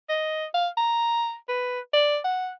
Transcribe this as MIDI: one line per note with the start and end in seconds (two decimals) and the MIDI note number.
0.09 0.45 75
0.54 0.68 77
0.77 1.35 82
1.48 1.80 71
1.93 2.19 74
2.24 2.51 78